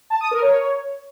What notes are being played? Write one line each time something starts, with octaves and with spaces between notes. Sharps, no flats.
A5
D#6
A#4
C#5